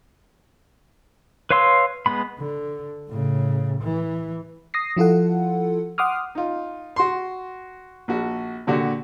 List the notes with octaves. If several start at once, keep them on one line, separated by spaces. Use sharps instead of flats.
B4 C#5 F5 C6 E6
G#3 B3 B5
D3
A2 C#3
E3
D#6 A#6 C7
F3 E4 F4 A4 F#5
F#5 C6 D6 D#6 F6
D#4 F4
F#4 C6
A#1 F#4
A#2 D3 F#4 G4